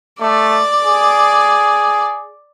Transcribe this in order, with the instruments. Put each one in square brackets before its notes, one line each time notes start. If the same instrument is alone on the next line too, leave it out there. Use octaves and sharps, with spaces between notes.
[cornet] A3 [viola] D5
[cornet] G#4